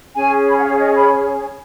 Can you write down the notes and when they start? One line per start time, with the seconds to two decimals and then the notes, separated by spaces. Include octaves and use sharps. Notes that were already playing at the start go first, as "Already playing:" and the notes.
0.15 C#4 G#4 C#5 G#5
0.47 B5
0.56 F#5
0.63 F5
0.79 D#5
0.95 B5